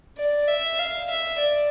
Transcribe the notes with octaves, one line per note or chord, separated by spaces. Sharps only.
D5
E5
F5
E5
D5